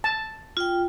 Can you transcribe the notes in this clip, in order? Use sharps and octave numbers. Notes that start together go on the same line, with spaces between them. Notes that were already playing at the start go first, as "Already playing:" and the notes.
A5
F4 G5